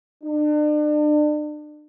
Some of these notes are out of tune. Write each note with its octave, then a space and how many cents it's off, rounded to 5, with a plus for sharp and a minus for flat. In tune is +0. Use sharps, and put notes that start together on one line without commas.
D4 +35